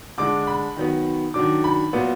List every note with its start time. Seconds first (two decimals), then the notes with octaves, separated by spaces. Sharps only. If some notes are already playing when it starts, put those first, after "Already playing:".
0.18 D3 G#3 D4 D6
0.47 B5
0.77 D#3 F#3 B3
1.34 D#3 F#3 D4 D6
1.64 B5
1.93 A#2 F#3 B3